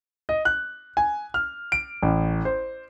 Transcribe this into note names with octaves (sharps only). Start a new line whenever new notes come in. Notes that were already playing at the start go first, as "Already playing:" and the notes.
D#5
F#6
G#5
F6
D7
A1
C5